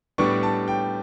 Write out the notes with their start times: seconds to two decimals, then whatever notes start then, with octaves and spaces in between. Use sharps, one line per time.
0.18 A2 G3 B3 D4 C#6
0.43 A5
0.68 G5